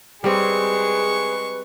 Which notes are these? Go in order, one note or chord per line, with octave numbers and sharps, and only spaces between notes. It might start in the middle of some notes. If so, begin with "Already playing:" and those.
G3 G#3 C4 G#4 B4 C#6